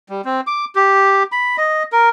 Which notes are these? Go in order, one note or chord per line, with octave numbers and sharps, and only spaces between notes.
G3
C4
D6
G4
B5
D#5
A#4